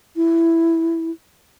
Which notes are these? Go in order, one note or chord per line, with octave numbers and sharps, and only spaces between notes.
E4